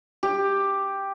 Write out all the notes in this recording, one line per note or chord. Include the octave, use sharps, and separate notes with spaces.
G4